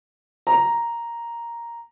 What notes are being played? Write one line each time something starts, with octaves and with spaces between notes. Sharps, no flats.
A#5